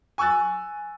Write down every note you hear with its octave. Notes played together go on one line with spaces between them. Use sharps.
G#5 C#6 E6 F#6 A6